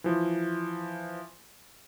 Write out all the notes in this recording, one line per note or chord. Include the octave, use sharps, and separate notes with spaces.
E3 F3